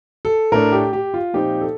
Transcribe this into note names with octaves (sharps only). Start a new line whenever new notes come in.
A4
A2 A3 D4 A#4
G4
G4
F4
A#2 F3 C4 D#4 G4
A4